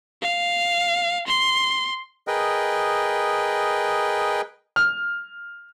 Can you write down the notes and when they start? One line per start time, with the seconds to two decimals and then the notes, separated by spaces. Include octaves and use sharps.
0.22 F5
1.27 C6
2.27 G#4 A#4 B4 D#5 G5
4.76 F6